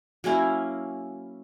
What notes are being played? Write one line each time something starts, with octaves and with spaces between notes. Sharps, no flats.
F#3 A#3 C#4 E4